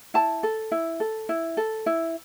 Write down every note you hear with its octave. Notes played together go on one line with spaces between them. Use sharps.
E4 A5
A4
E4
A4
E4
A4
E4